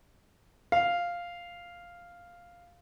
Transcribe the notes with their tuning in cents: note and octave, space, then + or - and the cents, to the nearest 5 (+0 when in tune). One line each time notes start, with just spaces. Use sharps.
F5 +0